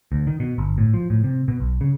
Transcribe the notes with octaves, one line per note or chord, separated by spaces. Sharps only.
D2
D#3
B2
G1
A2
F3
A2
C3
B2
B1
C#3